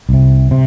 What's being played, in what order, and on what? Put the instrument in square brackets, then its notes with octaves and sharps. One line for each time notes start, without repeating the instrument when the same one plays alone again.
[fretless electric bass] C2 C3
C3